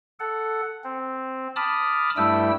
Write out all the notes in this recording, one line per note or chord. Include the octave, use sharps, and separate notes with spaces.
A4 F#5
C4
A5 B5 D6 D#6 F6
G2 G3 A3 E4 G5 E6